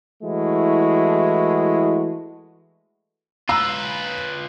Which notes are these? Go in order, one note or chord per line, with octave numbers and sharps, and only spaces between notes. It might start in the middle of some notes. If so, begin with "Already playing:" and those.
E3 G#3 A3 E4 F#4
F4 B4 A#5 E6